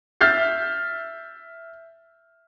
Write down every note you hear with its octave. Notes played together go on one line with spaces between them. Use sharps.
E5 F6 G6 A6 C7